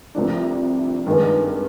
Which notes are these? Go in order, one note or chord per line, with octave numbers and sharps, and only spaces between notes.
C2 C3 F3 A3 D4
G2 D#3 G#3